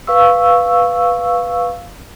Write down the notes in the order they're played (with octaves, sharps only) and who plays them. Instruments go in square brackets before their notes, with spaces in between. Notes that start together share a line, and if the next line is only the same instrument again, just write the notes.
[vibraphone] B4 F5 C#6 E6